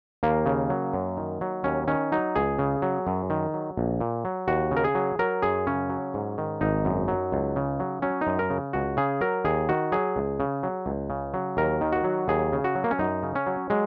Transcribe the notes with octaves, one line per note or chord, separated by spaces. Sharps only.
D#2 A#3
C#3
F#3
F#2
D#3
F#3
D#2 C#4
D#3 C#4
F#3 D#4
C#2 G#4
C#3
F#3
F#2
D#3
F#3
A#1
A#2
F#3
D#2 F#4
C#3
A#4
G#4
F#3
F#3 A#4
F#2 G#4
C#3 C#4
F#3
G#2
D#3
G#1 D#4
F#2
F#3
C#2
C#3
F#3
F#3 C#4
D#4
F#2
A#4
C#3
C#2 F#4
C#3 G#4
F#3 A#4
D#2 G#4
D#3 F#4
F#3 G#4
C#2
C#3
F#3
C#2
C#3
F#3
D#2 A#4
D#3
F#4
F#3
D#2 G#4
C#3
F#4
F#3
A#3
C#4
F#2 D#4
C#3
C#4
F#3
F#3 G#3